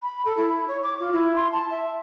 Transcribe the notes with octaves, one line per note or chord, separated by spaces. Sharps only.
B5
A4
E4
C#5
D6
F4
E4
C6
A5
E5